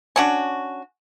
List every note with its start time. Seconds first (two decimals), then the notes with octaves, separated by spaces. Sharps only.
0.16 C#4 D4 F#4